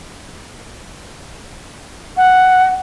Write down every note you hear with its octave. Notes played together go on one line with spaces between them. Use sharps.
F#5